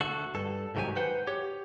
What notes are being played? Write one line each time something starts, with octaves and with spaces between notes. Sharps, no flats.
D2 F#4 A4
G2 A4
C2 G#2 D#3 F#3 G4 G#5
B4 C5 F#5 G5
G4 C#5